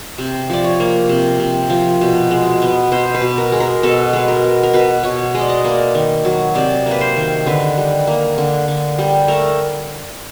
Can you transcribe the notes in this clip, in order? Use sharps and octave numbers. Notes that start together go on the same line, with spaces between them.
C3
F3 D5
C#5
A#3
C3
C3
F3
B2
G#3
B3
B2 C5
B4
B2
A#4
G#3
A#4
B2 A4
G#3 B4
A#4
B3
A#4
B2 B4
B2 C#5
G#3 D#5
D5
D#5
A#3 D5
D#3
F#3
C3 D5
A#3
B4
C5
D#3
D3 B4
G3
A#3
D3
D3
G3
A3 A#4